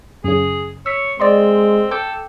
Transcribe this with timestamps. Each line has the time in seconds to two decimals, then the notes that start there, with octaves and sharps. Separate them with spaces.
0.24 F#2 C#3 G#4
0.86 C#5 E6 B6
1.20 G#3 C4 D5 D#5 C6
1.91 A4 G5 D6 G6